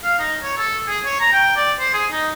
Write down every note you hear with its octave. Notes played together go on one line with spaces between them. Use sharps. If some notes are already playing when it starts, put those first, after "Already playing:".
F5
D#4
C#5
A4
G#4
C#5
A#5
G5
D5
C5
G#4
D#4